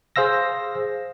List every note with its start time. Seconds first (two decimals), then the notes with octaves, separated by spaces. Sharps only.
0.16 G#4 C5 F5 E6 A#6